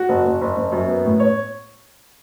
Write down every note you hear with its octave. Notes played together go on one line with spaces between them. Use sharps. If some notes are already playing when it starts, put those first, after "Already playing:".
Already playing: F#4
F#1
F#1
F#1
F#1
F#2
B3
A2
C#5